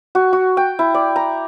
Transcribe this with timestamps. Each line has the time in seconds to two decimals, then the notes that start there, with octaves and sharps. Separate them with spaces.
0.15 F#4
0.33 F#4
0.57 G5
0.79 E4
0.94 D5
1.16 A#5